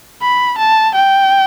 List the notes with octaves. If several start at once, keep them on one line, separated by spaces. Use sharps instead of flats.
B5
A5
G5